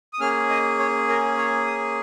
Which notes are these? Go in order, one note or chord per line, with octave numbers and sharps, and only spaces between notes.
D#6
A#3 C#4 G#4 F6
D#5
C#5
A#4
C#5
D#6